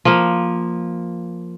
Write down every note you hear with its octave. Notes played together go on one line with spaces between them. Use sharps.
F3 A#3